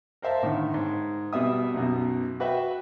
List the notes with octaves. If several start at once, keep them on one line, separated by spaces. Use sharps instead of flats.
A#4 C5 E5 F5 A5
A2 D3 D#3
G#2
B2 G3 E5 D#6
B1 F#2 B2
F#4 B4 E5 G5